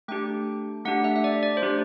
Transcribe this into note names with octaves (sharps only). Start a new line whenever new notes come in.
A3 D4 G4 G5
A3 D4 G4 F#5
E5
E5
D5
D5
C5
A3 D4 G4